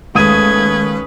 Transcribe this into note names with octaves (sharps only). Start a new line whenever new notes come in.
D#2 G#3 A3 C#4 B4 D#6 G#6 D#7